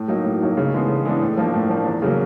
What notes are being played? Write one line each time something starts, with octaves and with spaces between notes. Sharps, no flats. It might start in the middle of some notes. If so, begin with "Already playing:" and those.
Already playing: A2
F#3 A#3 D#4
A2
F#3 A#3 D#4
C#3
E3 G#3 B3 D4
C#3
E3 G#3 B3 D4
A2
F3 A#3 D4
A2
F3 A#3 D4
E2
C#3 F#3 A#3